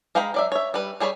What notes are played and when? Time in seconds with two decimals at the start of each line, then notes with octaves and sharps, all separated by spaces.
0.15 G#3 F5 G5 A#5 B5
0.34 F#3 D5 E5
0.52 C#5 E5
0.74 G3 B4
1.00 G3 G#4 C#5 B5